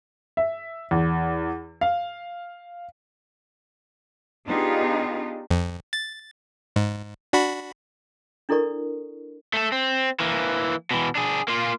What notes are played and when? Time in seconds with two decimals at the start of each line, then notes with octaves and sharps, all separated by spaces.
0.37 E5
0.91 E2
1.81 F5
4.46 B3 D4 D#4 F4 G4 G#4
5.50 F2
5.93 A6
6.76 G#2
7.33 D4 F#4 B5
8.49 D4 E4 A4 A#4 D5 C#6
9.54 A3 A4
9.72 C4
10.20 E3 A#3
10.91 B2 E3
11.15 D4 G#4
11.48 A#3 F4